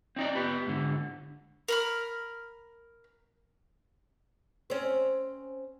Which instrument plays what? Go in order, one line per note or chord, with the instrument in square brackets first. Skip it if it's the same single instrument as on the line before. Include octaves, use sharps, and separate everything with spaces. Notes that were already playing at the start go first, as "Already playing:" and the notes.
[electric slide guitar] C4 D#4 D5
B3 G4 B4
G#2 D3
[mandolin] A#4 B5 F6
[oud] C4 C#4